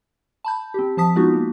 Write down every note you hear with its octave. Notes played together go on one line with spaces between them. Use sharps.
A5 B5 G6
C4 G4
F3 C4 A5 D#6 B6
G#3 B3 D4 D#4 F4 F#4
A#3